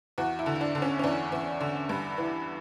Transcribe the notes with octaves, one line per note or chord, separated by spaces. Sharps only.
E2 F#4
E4
D3
E4
D4
D3
C#4
C#4
E2 D4
E2
D3
G2
E3